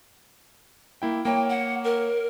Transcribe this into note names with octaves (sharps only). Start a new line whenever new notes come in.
A#3 E4 G5
A#3 C#5 G5
F#5
A#4